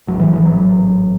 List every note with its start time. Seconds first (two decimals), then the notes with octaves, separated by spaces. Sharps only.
0.07 A1 G#2 F#3
0.19 E3
0.33 E3
0.45 F#3